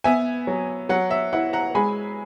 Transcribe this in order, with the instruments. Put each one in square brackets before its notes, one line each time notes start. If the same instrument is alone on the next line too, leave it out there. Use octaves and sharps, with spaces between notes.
[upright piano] B3 E5 G#5
F#3
F#3 F#5
E5
E4 F#5
F#5 A#5
G#3 G#5 B5